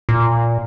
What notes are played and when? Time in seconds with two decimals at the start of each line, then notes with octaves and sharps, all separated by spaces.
0.09 A#2